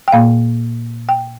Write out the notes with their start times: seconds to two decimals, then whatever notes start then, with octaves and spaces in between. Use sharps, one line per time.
0.08 G5
0.12 A#2 A#3 F5
1.09 G5